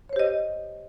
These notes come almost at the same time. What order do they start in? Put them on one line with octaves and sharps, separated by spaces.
C#5 C5 G4 D#5